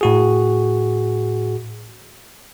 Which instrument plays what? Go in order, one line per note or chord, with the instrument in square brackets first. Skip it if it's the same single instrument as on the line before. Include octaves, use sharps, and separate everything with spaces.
[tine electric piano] A2 F#4 G#4